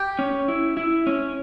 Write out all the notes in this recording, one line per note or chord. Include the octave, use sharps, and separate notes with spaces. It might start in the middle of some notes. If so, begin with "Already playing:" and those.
Already playing: G4
C#4
E4
E4
C#4